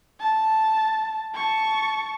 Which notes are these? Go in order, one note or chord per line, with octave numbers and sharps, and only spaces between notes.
A5
A5 C#6